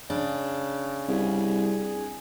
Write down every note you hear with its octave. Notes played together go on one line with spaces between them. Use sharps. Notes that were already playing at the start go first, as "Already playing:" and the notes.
C#3 D4
C2 G#4